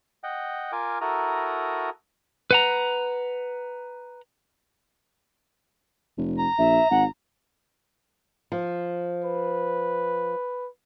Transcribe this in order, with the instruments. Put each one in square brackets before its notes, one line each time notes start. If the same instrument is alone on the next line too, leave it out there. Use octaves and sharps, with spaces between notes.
[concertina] D#5 F#5 G5
F4 A#4 G#5 D6
E4 F#4 A4 A#4 A#5 D#6
[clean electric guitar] B4 F#5 A#5
[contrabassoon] F1
[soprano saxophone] A#5
[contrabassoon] A#1 [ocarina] E5
[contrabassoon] G#1 [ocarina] F#5
[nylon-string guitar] F3
[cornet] B4